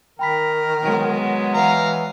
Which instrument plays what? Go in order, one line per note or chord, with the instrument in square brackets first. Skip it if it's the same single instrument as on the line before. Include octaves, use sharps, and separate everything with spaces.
[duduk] D#3 [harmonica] A#4 [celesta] G5 B5 B6
[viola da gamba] F#3 G#3 B3
[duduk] E3 [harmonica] F5 A#5 [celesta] F#5